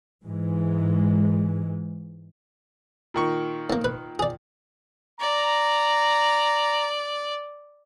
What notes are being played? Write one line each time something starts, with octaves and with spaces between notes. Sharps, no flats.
G#2 E3 G#3
A#2 D#3 C#6
A2 A#3
B4
G#4 D5
D5 A#5